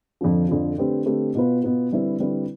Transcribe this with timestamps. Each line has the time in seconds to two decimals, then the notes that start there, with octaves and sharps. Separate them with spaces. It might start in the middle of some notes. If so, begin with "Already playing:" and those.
0.21 F2 D3 F3
0.48 F2 D3 F3
0.78 D3 A3 C4 G4 B4
1.06 D3 A3 C4 G4 B4
1.35 B2 B3 F4 B4
1.63 B2 B3 F4 B4
1.91 D3 G3 C4 E4 B4
2.20 D3 G3 C4 E4 B4